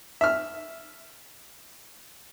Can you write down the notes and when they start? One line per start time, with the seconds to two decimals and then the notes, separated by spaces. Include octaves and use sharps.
0.21 E5 F6